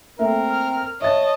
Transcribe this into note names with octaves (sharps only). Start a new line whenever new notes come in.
A3 A#3 C4 A#4 E5
F6
C#5 D#5 E5 A5 A6